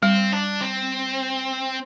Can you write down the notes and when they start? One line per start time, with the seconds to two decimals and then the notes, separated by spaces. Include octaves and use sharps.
0.03 G3 C4
0.32 D4
0.61 C4